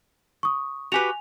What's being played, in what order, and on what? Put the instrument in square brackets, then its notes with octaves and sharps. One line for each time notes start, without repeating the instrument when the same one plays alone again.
[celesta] C#6 D#6
[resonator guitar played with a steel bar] F#4 G4 B4 [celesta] G#5 F7